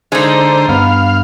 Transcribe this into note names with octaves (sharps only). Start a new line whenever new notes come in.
D3 G#3 D#4 C5
G2 B3 F5